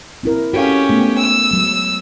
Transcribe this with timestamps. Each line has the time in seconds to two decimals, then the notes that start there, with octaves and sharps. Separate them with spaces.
0.23 C4 E4 A#4
0.53 C#4 F#4 G4 A4 F5
0.89 G#3 A3 B3
1.18 E6
1.51 F#3 G#3